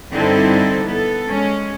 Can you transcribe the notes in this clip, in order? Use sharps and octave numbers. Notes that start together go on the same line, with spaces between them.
G2 D3 C4 D#4 E4 A4
B3 A4
G#3 C#4